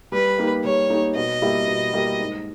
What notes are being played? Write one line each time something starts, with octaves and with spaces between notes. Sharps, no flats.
G3 B4
A#3 D#4 G4 A#4
G3 C#5
A#3 D#4 G4 A#4
B2 D#5
G3 A#3 E4 G4
B2
G3 A#3 E4 G4
G#2